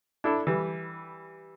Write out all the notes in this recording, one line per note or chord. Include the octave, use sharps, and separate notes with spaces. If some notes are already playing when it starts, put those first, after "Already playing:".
D4 E4 A4
E3 G3